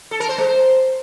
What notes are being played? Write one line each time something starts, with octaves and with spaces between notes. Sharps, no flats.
A4
A#4
C5
G#3
C5